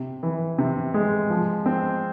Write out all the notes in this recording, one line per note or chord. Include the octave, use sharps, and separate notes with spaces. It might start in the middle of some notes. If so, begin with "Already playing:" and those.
Already playing: C3
E3
C3
G#3
F3
C4